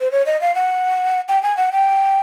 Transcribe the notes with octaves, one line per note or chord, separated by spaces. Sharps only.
C5
C#5
D#5
F5
F#5
G5
G#5
F#5
G5